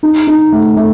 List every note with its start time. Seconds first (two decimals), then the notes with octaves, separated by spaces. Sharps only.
0.03 D#4
0.27 D#4
0.52 A3
0.77 A3